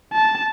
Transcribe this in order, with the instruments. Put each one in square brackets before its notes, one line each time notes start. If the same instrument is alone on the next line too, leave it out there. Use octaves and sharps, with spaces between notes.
[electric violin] A5